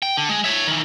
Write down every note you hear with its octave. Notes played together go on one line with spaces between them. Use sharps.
G5
D3
G#3
C#5 E5
D#3 E3